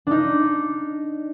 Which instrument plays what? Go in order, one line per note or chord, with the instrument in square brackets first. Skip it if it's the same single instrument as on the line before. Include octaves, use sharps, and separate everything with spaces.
[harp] D4 D#4